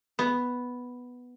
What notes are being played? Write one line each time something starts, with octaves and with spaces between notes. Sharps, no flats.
B3